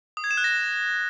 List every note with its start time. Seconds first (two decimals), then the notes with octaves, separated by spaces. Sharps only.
0.17 D#6
0.24 G#6
0.31 E7
0.37 F#6
0.44 A#6